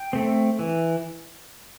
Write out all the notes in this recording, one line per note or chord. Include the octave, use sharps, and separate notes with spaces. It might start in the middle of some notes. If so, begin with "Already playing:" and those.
Already playing: G5
A3 C4
E3